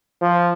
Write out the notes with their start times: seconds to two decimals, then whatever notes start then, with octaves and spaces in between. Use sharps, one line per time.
0.22 F3